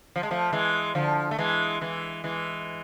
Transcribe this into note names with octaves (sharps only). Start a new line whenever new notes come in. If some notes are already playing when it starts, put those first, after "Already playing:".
F3
G#3
F3 A3
E3 G#3
D3 F3
A3
E3 G#3
E3 G#3
E3 G#3